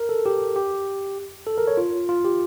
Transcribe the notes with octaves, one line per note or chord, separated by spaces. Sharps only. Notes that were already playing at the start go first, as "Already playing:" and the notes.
Already playing: A#4
A4
G4
G4
A4
A#4
C#5
F4
F4
G4